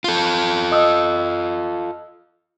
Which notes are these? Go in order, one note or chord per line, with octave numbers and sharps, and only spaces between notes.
F4 A4
D#5 D#6 E6